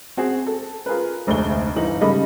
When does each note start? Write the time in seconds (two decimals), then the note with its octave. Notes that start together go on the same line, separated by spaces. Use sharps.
0.17 C4 F#4 G#4
0.47 A4
0.86 F4 G#4 A#4 B4
1.27 F1 D2 G#3 A3 G7
1.76 G1 E3 D#4 F#7
2.01 C#3 G3 G#3 A4 D#5 B5